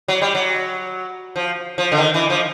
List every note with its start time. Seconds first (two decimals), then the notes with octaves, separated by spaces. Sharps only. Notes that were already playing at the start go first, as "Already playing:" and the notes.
0.08 F#3
0.22 G3
0.35 F#3
1.36 F3
1.78 F3
1.92 D3
1.98 D#3
2.14 E3
2.30 F3